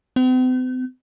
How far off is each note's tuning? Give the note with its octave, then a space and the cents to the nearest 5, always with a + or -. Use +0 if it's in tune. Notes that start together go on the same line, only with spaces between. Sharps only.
C4 -45